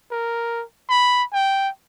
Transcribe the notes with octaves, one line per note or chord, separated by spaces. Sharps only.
A#4
B5
G5